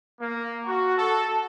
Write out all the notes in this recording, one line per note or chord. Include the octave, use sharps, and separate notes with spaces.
A#3
F#4
A4